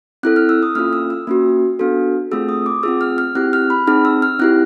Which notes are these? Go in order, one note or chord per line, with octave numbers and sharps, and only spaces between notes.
C4 E4 A4 F#6
F6
E6
D#6
A#3 C#4 F4 F6
E6
E6
A#3 C#4 F#4
B3 D4 F#4 A4
A3 C4 F4 G#4 E6
D#6
D6
C4 F4 G#4 E6
F6
F6
C4 E4 G4 F#6
F6
B5
C4 D#4 G#4 F6
E6
F6
C4 E4 G4 F#6